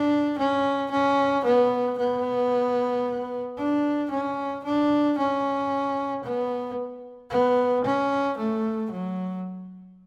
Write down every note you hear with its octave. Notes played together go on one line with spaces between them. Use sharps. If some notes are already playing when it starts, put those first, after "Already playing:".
Already playing: D4
C#4
C#4
B3
B3
D4
C#4
D4
C#4
B3
B3
C#4
A3
F#3